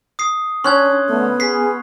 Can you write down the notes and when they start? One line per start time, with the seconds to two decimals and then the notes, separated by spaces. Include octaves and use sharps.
0.19 D#6 C7
0.64 C#4 D4 C6 F#6 G#6
1.08 D3 A3 B3
1.40 G#4 B6 C7